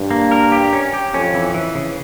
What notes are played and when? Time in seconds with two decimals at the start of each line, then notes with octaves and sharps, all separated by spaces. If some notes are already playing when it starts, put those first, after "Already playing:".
Already playing: G2
0.11 A#3
0.31 A#4
0.52 G4
0.73 C#4
0.94 G4
1.14 F2 C#4
1.34 E3
1.54 E3
1.75 C#3